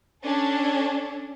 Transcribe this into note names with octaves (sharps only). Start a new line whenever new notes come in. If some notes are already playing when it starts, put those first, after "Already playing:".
C#4 D4 A4